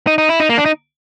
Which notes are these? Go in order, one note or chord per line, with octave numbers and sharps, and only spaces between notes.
D#4
D#4
E4
D#4
A#3
D4
D#4